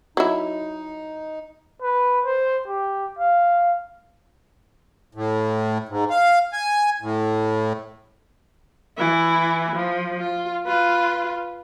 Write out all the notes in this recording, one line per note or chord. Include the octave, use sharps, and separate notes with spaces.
F#3 D#4 E4
B4
C5
G4
F5
A2
G#2
F5
G#5
A2
E3 E4
F3
F4
F4 B4